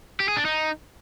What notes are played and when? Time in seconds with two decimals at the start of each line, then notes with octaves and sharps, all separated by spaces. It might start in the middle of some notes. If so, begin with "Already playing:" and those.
0.20 G4
0.28 G#4
0.37 D4
0.45 D#4